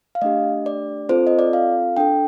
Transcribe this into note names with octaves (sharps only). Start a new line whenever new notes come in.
F5
A3 D4 G4 D#5
D5
C4 F4 A4 C5
D#5
D5
F5
D4 A4 G5